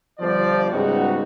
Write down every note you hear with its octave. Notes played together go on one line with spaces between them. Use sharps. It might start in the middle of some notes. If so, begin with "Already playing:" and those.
G1 F3 C5 D5
C#2 G#2 G3 B3 D#4 F#4